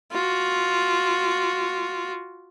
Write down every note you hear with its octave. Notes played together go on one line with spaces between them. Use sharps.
F4 F#4